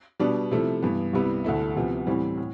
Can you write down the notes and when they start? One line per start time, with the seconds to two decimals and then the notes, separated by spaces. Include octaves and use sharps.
0.20 B2 G3 B3 D4
0.51 C3 F3 A3 E4
0.83 G2 E3 B3
1.13 C2 C3 G3 B3 E4
1.44 D2 D3 A3 E4
1.76 D2 C3 F3 B3
2.07 A2 E3 G3 C4
2.38 A2